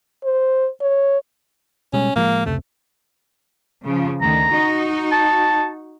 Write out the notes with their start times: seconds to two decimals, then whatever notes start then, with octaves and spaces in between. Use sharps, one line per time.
0.24 C5
0.81 C#5
1.93 B2 G3 G#3 C#4
2.16 A2 F3 G#3 A#3
2.46 F1 C#2 C3 A3
3.86 C#3 F3
4.21 D2 D#3 A#5
4.52 D#4 F#4
5.12 A5